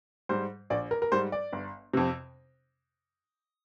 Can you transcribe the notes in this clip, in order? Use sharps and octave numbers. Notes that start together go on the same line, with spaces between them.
G#2 G3 C5
A#1 D5
A#4
A#4
G#2 G3 C5
D5
G1
F2 C3